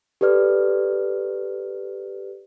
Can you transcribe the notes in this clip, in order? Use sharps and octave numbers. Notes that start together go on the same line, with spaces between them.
G4 A4 B4 D5 F6